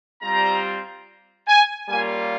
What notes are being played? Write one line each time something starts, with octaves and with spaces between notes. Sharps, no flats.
G3 C4 F4 A#5
G#5
G3 A#3 C#4 F4 G#5